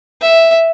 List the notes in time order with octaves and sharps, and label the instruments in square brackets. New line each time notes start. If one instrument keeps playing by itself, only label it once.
[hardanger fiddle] E5